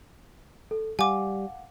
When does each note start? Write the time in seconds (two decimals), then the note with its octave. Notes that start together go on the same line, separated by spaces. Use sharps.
0.71 A4
0.99 G3 F5 F#5 G#5 D6